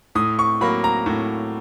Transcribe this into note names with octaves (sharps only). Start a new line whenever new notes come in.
A2 D#6
C#6
F#3 A#3 B5
A#5
A2